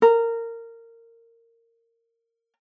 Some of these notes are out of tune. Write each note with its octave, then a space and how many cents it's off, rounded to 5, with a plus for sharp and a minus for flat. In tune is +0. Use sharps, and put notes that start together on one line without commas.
A#4 -20